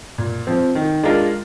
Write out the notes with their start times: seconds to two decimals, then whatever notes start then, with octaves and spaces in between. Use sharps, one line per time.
0.18 A#2
0.47 F3 C4
0.75 D#3
1.03 G#3 D4 F4 A#4